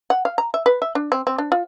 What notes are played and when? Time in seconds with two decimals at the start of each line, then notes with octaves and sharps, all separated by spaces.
0.10 F#5
0.25 F5
0.38 A#5
0.54 E5
0.66 B4
0.82 E5
0.95 D4
1.12 C4
1.27 C4
1.38 D4
1.52 F4